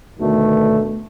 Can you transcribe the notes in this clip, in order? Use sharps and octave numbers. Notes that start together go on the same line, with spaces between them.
D2 B2 D#3 A3